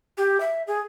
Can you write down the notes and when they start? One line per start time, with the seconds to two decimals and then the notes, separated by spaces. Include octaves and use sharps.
0.17 G4
0.40 E5
0.67 G#4